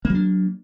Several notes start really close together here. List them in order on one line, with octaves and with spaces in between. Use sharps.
A#3 F#3 D4